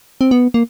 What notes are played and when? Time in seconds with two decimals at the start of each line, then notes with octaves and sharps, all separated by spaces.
0.21 C4
0.31 B3
0.54 A#3